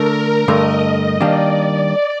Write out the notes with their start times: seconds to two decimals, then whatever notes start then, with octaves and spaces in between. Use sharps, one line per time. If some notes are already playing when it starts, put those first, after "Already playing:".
Already playing: D3 A3 D4 A4 A#4
0.11 A#4
0.47 G2 D3 A3 D#5
1.21 D#3 G3 A#3 D4 D5